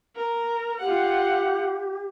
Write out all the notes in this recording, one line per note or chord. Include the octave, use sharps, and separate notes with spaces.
A#4
F4 G4 F#5